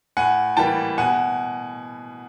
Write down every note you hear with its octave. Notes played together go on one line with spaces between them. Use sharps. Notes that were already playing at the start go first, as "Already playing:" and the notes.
A2 F#5 G#5
E3 G3 A#3 G5 A5
B2 F#5 G#5